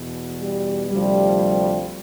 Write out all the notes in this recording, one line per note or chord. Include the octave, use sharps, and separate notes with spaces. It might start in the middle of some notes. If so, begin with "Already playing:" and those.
Already playing: E2 B2
G3
D2 C3 F3 G3